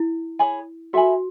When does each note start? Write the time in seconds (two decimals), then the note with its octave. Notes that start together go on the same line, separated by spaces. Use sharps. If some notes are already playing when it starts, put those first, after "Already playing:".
Already playing: E4
0.39 G#4 C#5 G#5 B5
0.93 F#4 A4 E5 G#5 B5